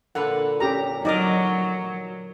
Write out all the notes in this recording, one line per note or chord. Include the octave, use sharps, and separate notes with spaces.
A#2 D3 B4 F#5
C#4 G4 A#5
F#3 D#4 F#4 A#4 D5 D#5